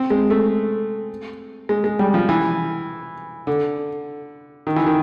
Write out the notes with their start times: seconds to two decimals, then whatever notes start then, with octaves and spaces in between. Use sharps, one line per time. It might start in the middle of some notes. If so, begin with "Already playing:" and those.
Already playing: C4
0.10 G#3
0.30 A3
1.69 G#3
1.84 G#3
1.99 G3
2.14 F3
2.29 E3
3.47 D3
4.67 D#3
4.76 E3
4.86 D#3